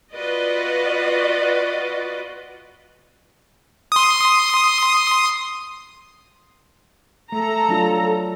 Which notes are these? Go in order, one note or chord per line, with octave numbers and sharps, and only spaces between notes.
F4 F#4 B4 D5 D#5
C6 D#6
A3 A4 A#5
F#3 D4 F4